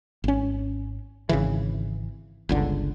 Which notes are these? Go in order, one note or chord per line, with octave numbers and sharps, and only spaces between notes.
G#1 C#4
G#1 C#3 E3
G1 C#2 D3